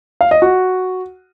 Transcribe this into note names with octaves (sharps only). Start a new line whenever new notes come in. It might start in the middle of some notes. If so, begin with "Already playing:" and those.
F5
D#5
F#4